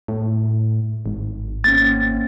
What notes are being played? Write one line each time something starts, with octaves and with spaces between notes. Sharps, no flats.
A2
G#1
A#3 C4 C#4 A6